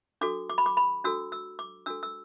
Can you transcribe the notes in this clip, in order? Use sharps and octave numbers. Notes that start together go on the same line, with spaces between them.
D4 F#4 A4 D6
D6
B5
D6
B5
D4 F#4 A4 E6
E6
D6
D4 F#4 A4 E6
E6